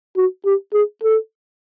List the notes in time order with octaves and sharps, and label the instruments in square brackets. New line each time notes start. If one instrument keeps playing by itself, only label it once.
[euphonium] F#4
G4
G#4
A4